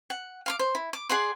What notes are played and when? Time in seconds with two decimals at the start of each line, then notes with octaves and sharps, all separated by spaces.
0.10 F#5
0.46 F5 C6 D6
0.59 C5
0.75 E4
0.93 D6
1.09 G#4 D5 F#5 C6